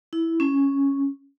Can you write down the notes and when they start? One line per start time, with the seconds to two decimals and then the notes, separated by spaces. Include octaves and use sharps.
0.13 E4
0.40 C#4